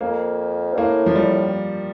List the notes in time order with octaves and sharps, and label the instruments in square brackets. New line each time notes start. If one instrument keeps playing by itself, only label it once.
[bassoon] F2 [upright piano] A#3
[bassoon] G2
[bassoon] A2 [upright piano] A#3
[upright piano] F3
G3